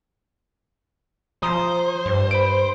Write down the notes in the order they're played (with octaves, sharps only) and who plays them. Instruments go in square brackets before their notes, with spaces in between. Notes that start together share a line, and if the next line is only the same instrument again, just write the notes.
[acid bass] F3 [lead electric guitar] C5 [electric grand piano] A#5 D#6
[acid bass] G2
[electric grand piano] B5 D7